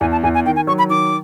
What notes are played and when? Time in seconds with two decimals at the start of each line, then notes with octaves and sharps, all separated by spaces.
0.01 E2 G#5
0.12 A5
0.23 E2 G#5
0.35 G#5
0.45 D#3 G5
0.56 G#5
0.67 F#3 C#6
0.78 B5
0.90 D#3 D6